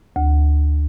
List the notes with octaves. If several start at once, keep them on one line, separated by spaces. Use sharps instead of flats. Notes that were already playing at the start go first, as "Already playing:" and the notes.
D2